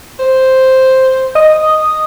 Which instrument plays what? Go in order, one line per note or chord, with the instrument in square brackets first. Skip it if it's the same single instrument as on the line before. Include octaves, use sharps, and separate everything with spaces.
[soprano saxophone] C5
[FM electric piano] D#5 D#6